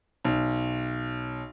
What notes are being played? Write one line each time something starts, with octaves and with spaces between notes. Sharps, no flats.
B1